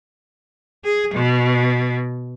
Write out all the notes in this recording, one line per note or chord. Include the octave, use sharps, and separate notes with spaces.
G#4
B2